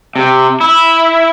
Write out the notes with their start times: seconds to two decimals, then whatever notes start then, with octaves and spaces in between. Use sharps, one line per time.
0.16 C3
0.61 E4